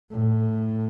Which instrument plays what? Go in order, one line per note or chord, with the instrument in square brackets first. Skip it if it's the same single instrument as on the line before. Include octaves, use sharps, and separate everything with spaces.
[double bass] A2